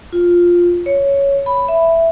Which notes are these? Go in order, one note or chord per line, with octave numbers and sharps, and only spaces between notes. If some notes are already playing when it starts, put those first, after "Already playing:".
F4
C#5
B5
E5